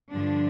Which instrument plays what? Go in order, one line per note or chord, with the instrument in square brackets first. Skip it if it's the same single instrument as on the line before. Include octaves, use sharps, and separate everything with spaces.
[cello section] G2 D3 F3 D4